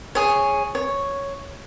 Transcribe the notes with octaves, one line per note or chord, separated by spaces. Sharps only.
G#4 C#5
C#5